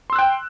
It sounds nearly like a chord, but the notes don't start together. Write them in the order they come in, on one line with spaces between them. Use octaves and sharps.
C6 E6 F#6 G5